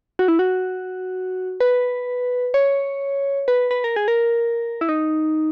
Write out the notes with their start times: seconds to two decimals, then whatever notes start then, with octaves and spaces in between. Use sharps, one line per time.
0.19 F#4
0.28 E4
0.39 F#4
1.60 B4
2.54 C#5
3.48 B4
3.71 B4
3.84 A#4
3.96 G#4
4.08 A#4
4.81 E4
4.89 D#4